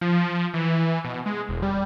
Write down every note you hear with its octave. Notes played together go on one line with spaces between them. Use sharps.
F3
E3
B2
G#3
E1
G3